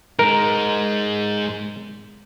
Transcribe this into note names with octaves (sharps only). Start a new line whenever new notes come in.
G#3 D#4 A#4